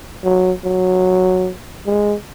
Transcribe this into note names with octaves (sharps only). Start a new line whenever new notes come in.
F#3
F#3
G#3